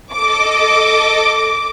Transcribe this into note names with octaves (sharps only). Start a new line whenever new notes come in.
A4 D#5 D6